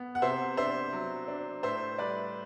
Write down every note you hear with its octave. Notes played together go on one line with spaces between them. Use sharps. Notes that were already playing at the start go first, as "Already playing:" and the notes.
Already playing: B3
F#5
C3 C5 E5
D4 C5 E5
F#3
D4
A2 C5 E5
G3 B4 D5